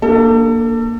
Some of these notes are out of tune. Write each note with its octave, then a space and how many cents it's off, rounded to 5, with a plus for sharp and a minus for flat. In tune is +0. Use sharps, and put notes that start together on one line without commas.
A#3 +0 D4 +0 A4 +30